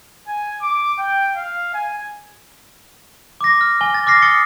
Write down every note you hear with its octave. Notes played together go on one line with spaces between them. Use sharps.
G#5
D6
G5
F5
G#5
D6 A#6
F6
G#5 G7
A6
D6 F6 A#6 C7
D#6 A6 C#7 G7